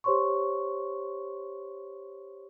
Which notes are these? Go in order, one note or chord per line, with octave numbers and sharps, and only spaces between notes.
G4 C5 C#5 C6 C#6